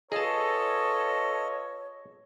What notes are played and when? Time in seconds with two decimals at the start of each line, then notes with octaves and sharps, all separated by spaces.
0.12 F4 G#4 A4 B4 C#5 D#5 A5